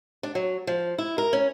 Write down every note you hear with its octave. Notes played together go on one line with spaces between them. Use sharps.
D4
F#3
F3
E4
A#4
C#4